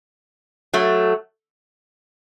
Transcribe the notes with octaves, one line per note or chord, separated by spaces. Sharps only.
F#3 A3